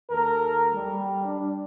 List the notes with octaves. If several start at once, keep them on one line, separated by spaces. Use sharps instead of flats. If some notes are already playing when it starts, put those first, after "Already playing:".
D#2 A4 A#4
G3
D4